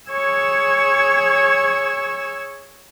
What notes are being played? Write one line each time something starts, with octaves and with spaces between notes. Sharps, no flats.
G#4 C#5 C#6 E6 G#6